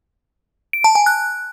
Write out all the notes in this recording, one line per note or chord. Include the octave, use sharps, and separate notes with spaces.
D7
A5
G#5
F#6